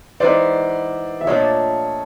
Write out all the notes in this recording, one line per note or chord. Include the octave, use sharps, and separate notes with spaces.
E3 G#3 B3 D#4 C5 D5
E5
A#2 F3 A3 D4 C#5 D#5